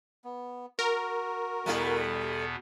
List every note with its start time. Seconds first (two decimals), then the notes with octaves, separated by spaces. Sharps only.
0.24 B3
0.79 F#4 A#4
1.66 E2 B2 G3 A3 B3 E4